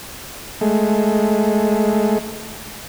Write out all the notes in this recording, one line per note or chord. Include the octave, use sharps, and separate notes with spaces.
G#3 A3